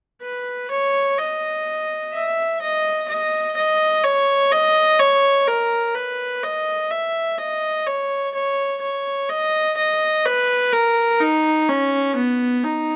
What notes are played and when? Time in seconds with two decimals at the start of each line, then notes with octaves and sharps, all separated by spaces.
0.22 B4
0.70 C#5
1.18 D#5
2.13 E5
2.61 D#5
3.08 D#5
3.56 D#5
4.04 C#5
4.52 D#5
4.99 C#5
5.47 A#4
5.95 B4
6.43 D#5
6.90 E5
7.38 D#5
7.86 C#5
8.34 C#5
8.82 C#5
9.29 D#5
9.77 D#5
10.25 B4
10.72 A#4
11.20 D#4
11.69 C#4
12.15 B3
12.63 D#4